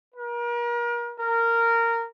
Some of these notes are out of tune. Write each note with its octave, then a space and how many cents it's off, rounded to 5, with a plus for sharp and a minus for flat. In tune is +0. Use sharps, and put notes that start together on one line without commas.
A#4 +35
A#4 -15